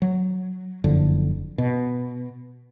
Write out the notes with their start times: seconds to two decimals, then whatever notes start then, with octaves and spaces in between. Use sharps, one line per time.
0.02 F#3
0.84 F#1 F2 D3
1.58 B2